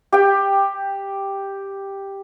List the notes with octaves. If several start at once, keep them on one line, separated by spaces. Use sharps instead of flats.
G4 G5